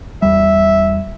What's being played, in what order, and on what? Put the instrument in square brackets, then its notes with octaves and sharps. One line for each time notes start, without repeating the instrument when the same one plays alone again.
[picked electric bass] E2 G3 [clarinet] E5